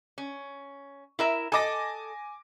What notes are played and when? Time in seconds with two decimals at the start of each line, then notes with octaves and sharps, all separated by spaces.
0.18 C#4
1.19 E4 A#4 E5
1.52 A4 D#5 G#5 D6 A#6